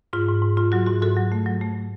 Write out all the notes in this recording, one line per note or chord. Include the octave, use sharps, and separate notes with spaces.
G#2 F4
G#2
G#2
G#2 F4
F#3 F#4
G#2 F#4
G#2 F#4 A4
F#3
A3
F#3
A3